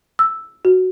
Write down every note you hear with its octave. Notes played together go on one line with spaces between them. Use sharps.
E6
F#4